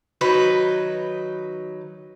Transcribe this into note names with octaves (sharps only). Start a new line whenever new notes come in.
D#3 F#3 D#4 B4